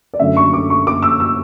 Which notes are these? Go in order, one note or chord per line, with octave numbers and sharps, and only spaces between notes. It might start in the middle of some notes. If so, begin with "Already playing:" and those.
D5
F#2 D3 A3 C#4 E5
C#6
D6
C#6
D6
E6
E6